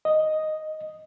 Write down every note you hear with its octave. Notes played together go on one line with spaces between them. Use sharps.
D#5